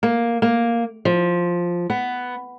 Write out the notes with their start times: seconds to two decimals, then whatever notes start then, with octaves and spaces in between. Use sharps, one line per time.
0.03 A#3
0.42 A#3
1.05 F3
1.90 B3